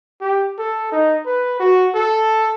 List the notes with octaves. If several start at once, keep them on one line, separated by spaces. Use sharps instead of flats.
G4
A4
D#4
B4
F#4
A4